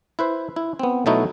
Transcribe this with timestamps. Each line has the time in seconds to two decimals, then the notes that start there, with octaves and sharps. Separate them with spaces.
0.19 E4 B4 C5
0.56 E4
0.79 B3 C4
1.06 B2 F#3 A3 D#4 E4 F#4